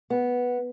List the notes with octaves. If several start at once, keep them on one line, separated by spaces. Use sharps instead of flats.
B3